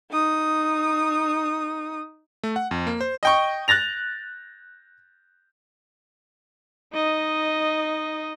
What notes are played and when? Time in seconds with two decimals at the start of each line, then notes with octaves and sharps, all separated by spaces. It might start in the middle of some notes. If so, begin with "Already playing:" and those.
0.11 D#4 D#6
2.43 A3
2.56 F#5
2.71 F2
2.87 A#3
3.01 C5
3.23 D#5 G5 C#6
3.68 F#6 A6 A#6 F7
6.93 D#4 D#5